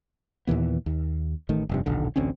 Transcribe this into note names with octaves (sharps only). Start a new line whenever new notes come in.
D#2 A#2 E3 B3
D#2
A1 D#3 A3
F1 G2 C3
D#1 B1 D3
A1 D2 C4 C#4